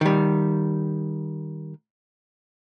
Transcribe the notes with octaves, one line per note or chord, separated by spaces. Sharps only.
D#3 G3